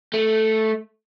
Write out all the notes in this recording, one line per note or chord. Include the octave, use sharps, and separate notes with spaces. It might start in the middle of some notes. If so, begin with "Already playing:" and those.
A3